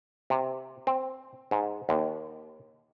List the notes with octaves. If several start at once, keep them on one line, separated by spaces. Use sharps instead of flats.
C3
C4
G#2
D#2